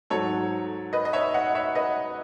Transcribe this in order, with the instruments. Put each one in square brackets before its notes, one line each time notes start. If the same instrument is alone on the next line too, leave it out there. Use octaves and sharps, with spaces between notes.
[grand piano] G#2 F#3 A4 C#5
B4 D#5
D#5
C#5 E5
D#5 F#5
C#5 E5
B4 D#5